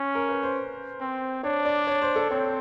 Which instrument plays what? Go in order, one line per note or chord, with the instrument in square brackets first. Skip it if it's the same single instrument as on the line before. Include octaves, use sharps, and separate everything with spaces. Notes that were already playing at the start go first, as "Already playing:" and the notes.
Already playing: [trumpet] C#4
[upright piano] A#4
B4
C5
[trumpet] C4
[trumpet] D4 [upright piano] C#5
[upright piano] D5
C#5
C5
A4
[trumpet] C4 [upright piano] C#5